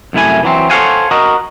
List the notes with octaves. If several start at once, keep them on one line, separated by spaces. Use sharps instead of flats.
C2 F#2 A3 E4 G#5
E3 F#3 C4
A4 C5 C#5 F5 F#5 G#5
F#4 A#4 D#5